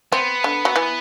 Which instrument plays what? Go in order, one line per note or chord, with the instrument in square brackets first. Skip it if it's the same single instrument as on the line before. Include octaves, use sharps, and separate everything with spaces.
[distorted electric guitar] B3 [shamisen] C4
[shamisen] D3
F#3
E3